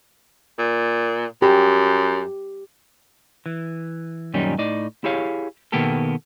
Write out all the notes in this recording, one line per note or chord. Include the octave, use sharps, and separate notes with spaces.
A#2
F#2 G4
E3
F#2 A#2 D#3 G3 C#4 D#4
A2 D#4 D5
E4 G4 G#4 C#5 F5
B2 D#3 A#3 B3 G4 A4